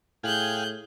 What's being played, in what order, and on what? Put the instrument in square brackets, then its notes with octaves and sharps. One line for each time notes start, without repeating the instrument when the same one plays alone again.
[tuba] A2 [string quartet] G#4 F#6 G6 [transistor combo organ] F5 G5 G#5